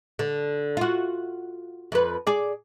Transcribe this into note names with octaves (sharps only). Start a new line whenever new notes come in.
D3
F4 F#4
F2 B4
G#4 D5